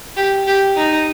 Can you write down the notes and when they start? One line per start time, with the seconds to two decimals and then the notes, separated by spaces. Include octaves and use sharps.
0.17 G4
0.47 G4
0.77 D#4